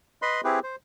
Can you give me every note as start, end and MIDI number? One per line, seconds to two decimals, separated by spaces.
0.22 0.41 71
0.22 0.41 75
0.22 0.41 83
0.22 0.41 84
0.44 0.59 60
0.44 0.59 64
0.44 0.59 67
0.44 0.59 68
0.44 0.59 71
0.63 0.76 72